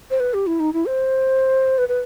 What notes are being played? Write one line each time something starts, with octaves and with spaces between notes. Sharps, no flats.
C5
B4
G4
E4
D#4
E4
C5
B4
B4